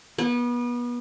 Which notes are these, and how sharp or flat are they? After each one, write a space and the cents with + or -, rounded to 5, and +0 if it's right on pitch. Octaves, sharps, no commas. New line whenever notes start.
B3 -30